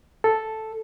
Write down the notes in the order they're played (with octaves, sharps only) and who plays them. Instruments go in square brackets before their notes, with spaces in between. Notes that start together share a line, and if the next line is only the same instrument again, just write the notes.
[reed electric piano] A4